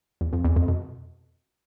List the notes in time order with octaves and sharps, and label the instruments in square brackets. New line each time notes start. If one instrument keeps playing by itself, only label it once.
[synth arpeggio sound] E2
F2
E2
F2
B2